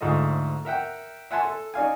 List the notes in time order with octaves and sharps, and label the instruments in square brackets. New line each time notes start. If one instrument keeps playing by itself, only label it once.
[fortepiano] D2 G#2 F4 A4 D#5
A#4 E5 F#5 G5
E5 F#5 G#5 A5 C6
A4
D#4 D5 F5 G#5